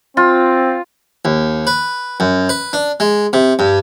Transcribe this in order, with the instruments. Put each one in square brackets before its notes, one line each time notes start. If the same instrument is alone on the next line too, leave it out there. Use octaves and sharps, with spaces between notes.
[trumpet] C4 [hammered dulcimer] F4
[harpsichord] D#2
B4
F#2
B4
D4
G#3
C3
G2